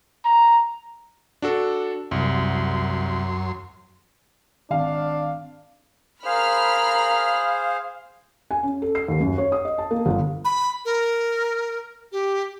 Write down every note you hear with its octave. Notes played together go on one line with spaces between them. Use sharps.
A#5
D4 F#4 A4
C2 F#2 C6
G#1 D4 F5
G#4 A#4 C5 F5 B5 F6
G#5
C#4
A4
C7
D#2
F#2
C#5
D#6
D#5
A5
A#3
G1
B5
A#4
G4